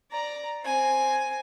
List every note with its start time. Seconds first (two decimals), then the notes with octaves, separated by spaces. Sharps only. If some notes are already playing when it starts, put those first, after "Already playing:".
0.11 D5 A#5
0.63 C4 G#5